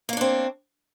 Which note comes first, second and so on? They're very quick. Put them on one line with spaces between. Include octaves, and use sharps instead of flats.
A#3 C#5 D4 C4